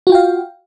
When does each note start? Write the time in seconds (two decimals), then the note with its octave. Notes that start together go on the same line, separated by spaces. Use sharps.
0.07 F#4
0.09 F4
0.12 G5
0.15 F5